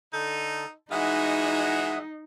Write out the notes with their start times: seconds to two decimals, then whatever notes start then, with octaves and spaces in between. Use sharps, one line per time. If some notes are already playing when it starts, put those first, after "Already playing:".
0.13 D3 D#4 A4
0.91 E3 G#3 D#4 F#4 E5 F#5 D#6